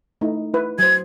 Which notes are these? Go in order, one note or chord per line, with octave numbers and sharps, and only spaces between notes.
A3 D#4 E4
E4 B4
F#3 C5 G#6